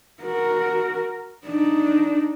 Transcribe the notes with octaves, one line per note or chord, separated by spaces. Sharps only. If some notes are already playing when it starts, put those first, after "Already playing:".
F#4 A#4
D4 D#4